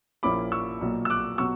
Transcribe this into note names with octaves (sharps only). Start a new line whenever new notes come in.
A#1 A#2 A#3 C#4 E4 B5 D6
C#6 E6
B1 A#2 A#3
E6
D6 F#6
B2 F#3 B3 C#6 E6